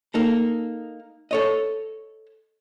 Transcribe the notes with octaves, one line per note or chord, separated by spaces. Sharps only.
A#3 D#4 A4
A4 C#5 D#5